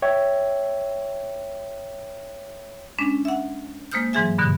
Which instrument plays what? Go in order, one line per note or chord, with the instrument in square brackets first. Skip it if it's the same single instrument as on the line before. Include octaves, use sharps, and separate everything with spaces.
[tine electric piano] C#5 E5 G5
[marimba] G#3 C#4 D4
E5 F#5
G#3 A#3 C5 D#6 F6 G6
G#2 E3 F#3 G#4 E5 G#5
G2 B2 D3 E3